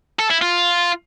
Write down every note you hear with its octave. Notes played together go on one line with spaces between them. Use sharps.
A4
E4
F4